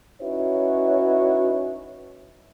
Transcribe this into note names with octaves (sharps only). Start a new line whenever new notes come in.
C#4 D#4 E4 F#4 B4 C#5